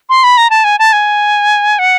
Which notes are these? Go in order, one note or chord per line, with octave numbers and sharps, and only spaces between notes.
C6
B5
A#5
A5
G#5
A5
G#5
F#5